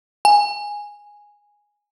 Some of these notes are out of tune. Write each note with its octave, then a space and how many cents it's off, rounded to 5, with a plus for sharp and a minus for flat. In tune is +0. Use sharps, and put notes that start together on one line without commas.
G#5 -5